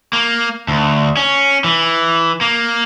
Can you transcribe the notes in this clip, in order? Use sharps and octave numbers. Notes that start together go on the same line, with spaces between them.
A#3
D2
C#4
E3
A#3